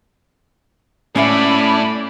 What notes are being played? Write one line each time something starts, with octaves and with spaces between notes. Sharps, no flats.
A2 C#4 D5 E5 F#5 B5